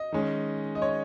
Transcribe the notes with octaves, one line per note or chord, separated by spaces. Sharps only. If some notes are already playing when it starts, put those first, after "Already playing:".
Already playing: D#5
D#3 G#3 C#4
D#5
C#5